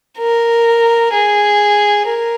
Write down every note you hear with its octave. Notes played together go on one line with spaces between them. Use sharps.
A#4
G#4
A#4